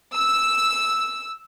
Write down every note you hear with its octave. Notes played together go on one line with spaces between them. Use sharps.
E6